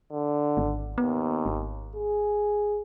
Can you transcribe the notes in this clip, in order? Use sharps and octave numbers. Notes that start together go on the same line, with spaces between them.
D3
G#1
D#2 B3
G#1
G#4